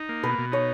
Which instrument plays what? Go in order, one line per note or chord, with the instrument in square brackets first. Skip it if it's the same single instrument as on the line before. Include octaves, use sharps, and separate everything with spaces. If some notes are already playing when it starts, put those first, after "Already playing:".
Already playing: [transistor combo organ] D#4
A#3
[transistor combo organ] B2 [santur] B4
[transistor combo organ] B2
[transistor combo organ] D#4 [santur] C#5